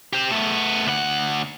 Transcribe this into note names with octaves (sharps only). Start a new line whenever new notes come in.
G4 C5
A3 B3
D2 F#5